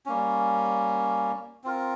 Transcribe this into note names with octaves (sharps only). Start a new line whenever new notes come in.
G3 A#3 C#4
C4 F4 A#4